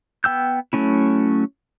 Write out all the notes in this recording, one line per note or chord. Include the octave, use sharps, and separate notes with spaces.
B3 G5 E6 G6
F#3 A3 C#4 E4